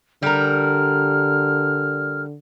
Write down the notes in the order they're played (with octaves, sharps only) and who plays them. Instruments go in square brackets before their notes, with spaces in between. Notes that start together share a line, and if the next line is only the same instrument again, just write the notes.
[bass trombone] D3 [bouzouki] G3 A#4 [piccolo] F6